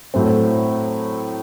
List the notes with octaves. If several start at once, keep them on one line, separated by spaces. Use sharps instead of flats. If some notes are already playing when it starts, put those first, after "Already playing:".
A2 F#3 A3 C4